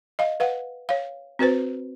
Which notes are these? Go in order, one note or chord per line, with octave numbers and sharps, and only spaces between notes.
D#5 F5
B4 F5 F#5
C#5 F5
C4 F#4 B4 C5